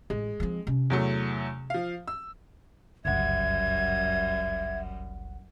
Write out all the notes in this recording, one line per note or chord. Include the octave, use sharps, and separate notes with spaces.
A1 G#3
F3 C4
C3 C#4
E2 F#3 A3
F3 F5
E6
G1 C#2 F#2 G3 E5 F#5 G#6